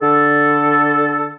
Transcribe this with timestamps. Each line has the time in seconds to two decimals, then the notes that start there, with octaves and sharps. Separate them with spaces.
0.02 D3 A4